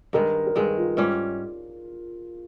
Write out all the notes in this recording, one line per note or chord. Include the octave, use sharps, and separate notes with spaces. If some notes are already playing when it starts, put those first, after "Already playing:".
G2 D#3 G#3 A#4
A#4
G2 D#3 G#3 G#4
F4
G#2 G3 C#4 F4